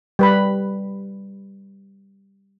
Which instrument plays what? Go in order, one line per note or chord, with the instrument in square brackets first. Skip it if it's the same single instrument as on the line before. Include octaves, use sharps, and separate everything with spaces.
[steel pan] G3 B4 B5